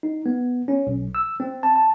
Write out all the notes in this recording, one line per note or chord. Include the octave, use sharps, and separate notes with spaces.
D#4
B3
C#4
B1
E6
C4
A5
A5